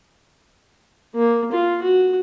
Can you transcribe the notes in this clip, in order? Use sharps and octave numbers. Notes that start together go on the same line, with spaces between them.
A#3
F4
F#4